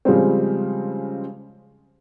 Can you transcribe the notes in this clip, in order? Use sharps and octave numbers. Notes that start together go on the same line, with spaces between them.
C#3 F3 G3 G#3 C4